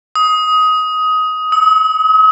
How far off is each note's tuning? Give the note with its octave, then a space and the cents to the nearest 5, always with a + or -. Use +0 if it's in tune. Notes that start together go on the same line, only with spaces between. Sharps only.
D#6 +15
D#6 +45